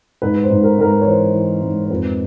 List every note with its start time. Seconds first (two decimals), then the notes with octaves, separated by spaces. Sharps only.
0.22 G#2 B4
0.43 C5
0.50 G#2
0.63 A#4
0.78 G#2 A#4
0.85 B4
1.01 C#5
1.06 E3 C5
1.34 E3
1.62 G#2
1.85 C5
1.90 F2 B4